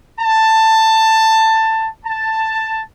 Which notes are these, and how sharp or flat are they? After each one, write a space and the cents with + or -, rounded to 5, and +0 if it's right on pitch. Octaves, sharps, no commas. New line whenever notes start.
A5 +15
A5 +10